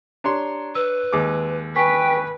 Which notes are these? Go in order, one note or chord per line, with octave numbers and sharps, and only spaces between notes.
D4 G4 C#5 A#5 C6
B4 E6
D#2 G#3 D6
B4 G5 G#5 C#6 B6